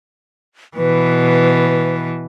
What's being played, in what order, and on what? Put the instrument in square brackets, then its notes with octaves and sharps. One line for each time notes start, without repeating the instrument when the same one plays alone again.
[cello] B2 E3 [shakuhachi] B4